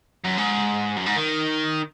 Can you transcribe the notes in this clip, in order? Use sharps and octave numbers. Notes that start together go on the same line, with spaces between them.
F#2
G#2
F#2
G#2
D#3